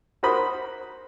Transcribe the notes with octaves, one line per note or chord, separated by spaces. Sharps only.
F#4 A#4 C5 B5 D#6